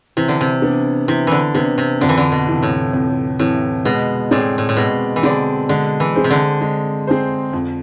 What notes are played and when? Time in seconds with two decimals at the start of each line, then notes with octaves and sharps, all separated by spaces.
0.17 C3 E3
0.28 D3
0.41 C3
0.62 B3 D4
1.08 C3 E3
1.27 D3 E3
1.55 C3 B3 D4
1.78 C3
2.01 F2 D3
2.09 E3
2.18 D3
2.32 B2
2.47 C3 E3
2.63 A2
2.93 F2
3.39 A2 C3 E3
3.85 B2 G#3
4.31 A2 C4 G#4 D5
4.58 A2
4.69 A2
4.77 B2 G#3
5.16 E3
5.23 D3 C4 G#4 D5
5.69 D3 G#3
6.00 E3
6.15 C4 G#4 C5
6.24 C3
6.30 D3
6.61 G#3
7.07 C4 G#4 C5
7.53 F2